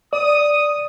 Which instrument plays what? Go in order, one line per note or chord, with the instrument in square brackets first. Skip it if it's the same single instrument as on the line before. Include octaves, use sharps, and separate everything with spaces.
[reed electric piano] D5 [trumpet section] D#6